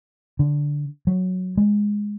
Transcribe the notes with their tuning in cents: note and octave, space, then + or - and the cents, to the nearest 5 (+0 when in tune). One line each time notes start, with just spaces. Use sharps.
D3 -5
F#3 -5
G#3 -5